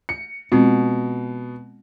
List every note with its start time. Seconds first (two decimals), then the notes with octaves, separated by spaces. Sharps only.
0.09 C#7
0.52 B2 G#3 C4 F4